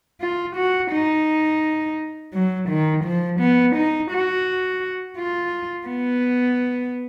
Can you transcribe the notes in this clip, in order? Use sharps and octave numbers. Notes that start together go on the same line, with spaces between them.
F4
F#4
D#4
F#3
D#3
F3
B3
D#4
F#4
F4
B3